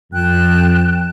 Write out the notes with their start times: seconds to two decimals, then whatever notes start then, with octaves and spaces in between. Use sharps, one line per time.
0.12 F2 G5 A5 F#6